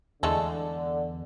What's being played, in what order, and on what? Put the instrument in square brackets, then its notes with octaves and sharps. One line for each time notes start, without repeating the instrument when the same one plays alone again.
[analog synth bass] E2 [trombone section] D3 [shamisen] G#3 A3 A4